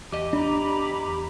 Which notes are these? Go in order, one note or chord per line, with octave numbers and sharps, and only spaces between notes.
E2 G4 D#5
D4 A#5 B5 D6